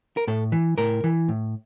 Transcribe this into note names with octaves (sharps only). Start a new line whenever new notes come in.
A#4
A2 A4
E3
A2 A#4
E3
A2